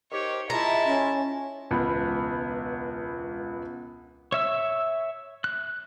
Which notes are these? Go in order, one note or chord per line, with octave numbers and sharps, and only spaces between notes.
D#3 G4 C5 C#5
G#3 E4 F4 E5 A5 A#5
C#4
E1 C#2 B3 B5
C#5 E5 E6
F#6